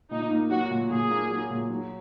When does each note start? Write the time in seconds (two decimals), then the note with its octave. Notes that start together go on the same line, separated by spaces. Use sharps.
0.11 A#2 D#4
0.30 A#3
0.50 F#3 F#4
0.70 A#2
0.90 A#2 G#4
1.11 A#3
1.30 F#3
1.51 A#2
1.70 F#3